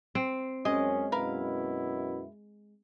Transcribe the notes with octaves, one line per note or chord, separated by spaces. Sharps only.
C4
F#2 G#3 C#4 D#5
F#2 B2 E4 A#4 B4 F5